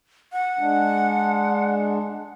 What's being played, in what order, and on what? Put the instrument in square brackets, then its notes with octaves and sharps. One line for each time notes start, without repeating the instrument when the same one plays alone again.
[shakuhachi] F#5
[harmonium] G#3 D4